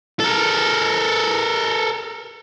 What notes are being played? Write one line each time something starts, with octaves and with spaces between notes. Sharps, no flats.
A4 A#4